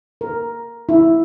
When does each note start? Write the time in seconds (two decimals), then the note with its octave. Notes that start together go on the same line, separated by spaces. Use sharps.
0.21 A#4
0.89 E4